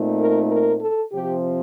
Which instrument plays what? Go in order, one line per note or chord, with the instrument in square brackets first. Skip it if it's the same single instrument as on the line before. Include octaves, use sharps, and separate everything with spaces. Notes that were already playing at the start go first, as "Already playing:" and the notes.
Already playing: [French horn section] A#2 A3 C4 D#4
A#4
A#4
A4
C3 F3 C4 G4